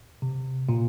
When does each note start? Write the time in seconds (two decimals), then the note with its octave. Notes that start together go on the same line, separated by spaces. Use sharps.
0.22 C3
0.69 A#2